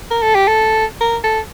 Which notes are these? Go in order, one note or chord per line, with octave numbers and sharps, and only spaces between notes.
A#4
A4
G4
A4
A#4
A4